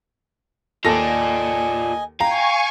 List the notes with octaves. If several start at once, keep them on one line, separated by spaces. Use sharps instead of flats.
D#2 F4 A4 D5 D#5 G#5 A#6
F5 G5 G#5 A#5 C#6